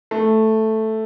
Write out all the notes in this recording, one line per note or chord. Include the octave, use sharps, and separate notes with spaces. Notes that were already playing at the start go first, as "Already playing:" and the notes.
A3